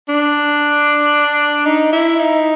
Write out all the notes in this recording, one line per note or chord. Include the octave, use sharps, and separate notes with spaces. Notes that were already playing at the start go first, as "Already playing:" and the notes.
D4
D#4
E4
D#4